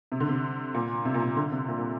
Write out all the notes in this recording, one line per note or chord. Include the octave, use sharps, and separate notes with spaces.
C3
D3
C3
A#2
C3
A#2
C3
D3
C3
A#2
A#2